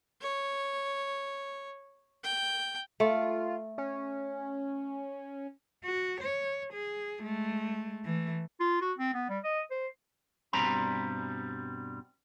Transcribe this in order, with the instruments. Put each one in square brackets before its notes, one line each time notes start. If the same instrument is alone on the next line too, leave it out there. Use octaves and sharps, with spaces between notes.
[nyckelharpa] C#5
G5
[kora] A3 [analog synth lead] F4
[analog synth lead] C#4
[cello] F#4
C#5
G#4
G#3 A3
E3 A3
[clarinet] F4
F#4
C4
B3
G3
D#5
C5
[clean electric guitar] G2 B2 G3 C4 A#5 B5